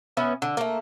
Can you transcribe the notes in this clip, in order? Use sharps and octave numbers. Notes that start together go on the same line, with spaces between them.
B3 C#4 E5
D3
A3 A#3